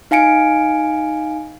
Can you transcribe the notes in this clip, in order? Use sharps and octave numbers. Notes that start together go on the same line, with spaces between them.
D#4 F5 G#5 C#7 D7